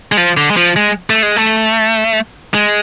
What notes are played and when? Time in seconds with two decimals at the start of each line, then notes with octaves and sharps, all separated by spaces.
0.12 G#3
0.17 F3
0.37 D3
0.51 G#3
0.57 F3
0.76 G#3
1.10 A3
1.23 G#3
1.36 A3
2.54 G#3